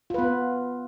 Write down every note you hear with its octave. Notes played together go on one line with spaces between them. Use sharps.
B3 F4 B4